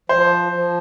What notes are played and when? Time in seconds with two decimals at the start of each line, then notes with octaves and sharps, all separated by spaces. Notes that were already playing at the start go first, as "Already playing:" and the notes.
0.09 F3 C5
0.52 F3